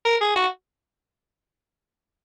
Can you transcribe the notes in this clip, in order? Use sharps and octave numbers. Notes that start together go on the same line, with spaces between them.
A#4
G#4
F#4